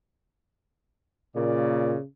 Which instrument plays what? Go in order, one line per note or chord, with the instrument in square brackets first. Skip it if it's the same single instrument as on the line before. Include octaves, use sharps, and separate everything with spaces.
[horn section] A#2 [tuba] C#3 [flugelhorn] D5